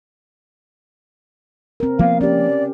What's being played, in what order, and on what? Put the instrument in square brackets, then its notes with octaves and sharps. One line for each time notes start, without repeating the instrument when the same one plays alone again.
[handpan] C4 A#4
[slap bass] F3 A#3 B3 [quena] F5
[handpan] C#4 G4 [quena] D5